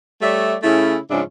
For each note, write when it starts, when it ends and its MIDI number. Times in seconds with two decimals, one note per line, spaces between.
0.22 0.55 55
0.22 0.55 57
0.22 0.55 73
0.22 0.55 74
0.22 0.55 76
0.63 0.98 49
0.63 0.98 57
0.63 0.98 61
0.63 0.98 64
1.11 1.22 44
1.11 1.22 49
1.11 1.22 53
1.11 1.22 61
1.11 1.22 62
1.11 1.22 76